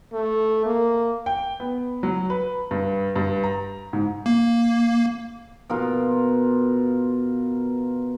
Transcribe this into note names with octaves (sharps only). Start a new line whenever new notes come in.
A3
A#3
G5
B3
F#3
B4
G2
G2
A#5
G#2
A#3
B2 F4 A#4